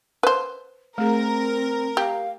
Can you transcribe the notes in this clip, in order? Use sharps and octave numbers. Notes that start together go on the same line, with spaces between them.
B4 C5
A3 C4 G#4 A#4
G4 F5 A#5